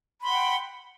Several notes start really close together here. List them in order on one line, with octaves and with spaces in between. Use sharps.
B5 C6 F#5 G5